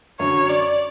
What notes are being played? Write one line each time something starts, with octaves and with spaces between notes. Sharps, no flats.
F#2 D3 F#3 C#5
D5